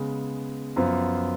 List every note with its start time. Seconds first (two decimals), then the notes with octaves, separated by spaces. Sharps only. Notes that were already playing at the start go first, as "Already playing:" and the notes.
Already playing: C#3 G#3 B3
0.76 F#2 F3 B3 F4